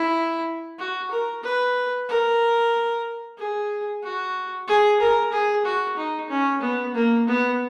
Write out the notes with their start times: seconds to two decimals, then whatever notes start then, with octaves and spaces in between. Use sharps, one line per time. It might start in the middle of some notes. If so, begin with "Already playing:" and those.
Already playing: E4
0.79 F#4
1.11 A#4
1.43 B4
2.09 A#4
3.38 G#4
4.03 F#4
4.68 G#4
5.00 A#4
5.32 G#4
5.65 F#4
5.97 D#4
6.30 C#4
6.61 B3
6.94 A#3
7.27 B3